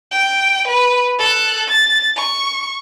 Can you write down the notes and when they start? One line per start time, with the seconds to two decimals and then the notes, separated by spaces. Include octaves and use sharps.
0.11 G5
0.67 B4
1.19 A4 F#6
1.68 A6
2.16 C#6